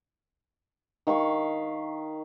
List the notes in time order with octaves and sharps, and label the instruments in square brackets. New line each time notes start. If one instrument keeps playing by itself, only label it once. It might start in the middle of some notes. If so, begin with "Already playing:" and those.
[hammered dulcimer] D#3 F5 B5 C#6